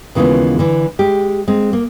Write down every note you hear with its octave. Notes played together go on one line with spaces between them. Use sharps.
D#2 C#3 E3 G#3 B3 F4
D3 E3
G#3 G4
G#3 C4
A#3